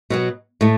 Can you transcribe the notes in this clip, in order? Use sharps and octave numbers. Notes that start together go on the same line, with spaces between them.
B2 F#3 B3
A2 A3